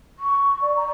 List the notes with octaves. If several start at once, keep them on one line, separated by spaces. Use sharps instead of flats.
C#6
D5
A#5